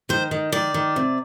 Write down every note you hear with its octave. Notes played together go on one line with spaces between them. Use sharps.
D#3 C5
D#3
D#3 D5
D#3
C3